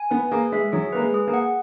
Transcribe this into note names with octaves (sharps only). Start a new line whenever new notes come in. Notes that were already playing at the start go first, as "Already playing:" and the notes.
Already playing: G#5
B3 B4
A#3 G#4
G#3 E5
F#3 G#4
A#3 B4
G#3
G#4
A#3
F#5